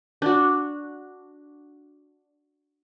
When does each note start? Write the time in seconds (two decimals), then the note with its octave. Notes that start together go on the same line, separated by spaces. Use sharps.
0.22 D4 F#4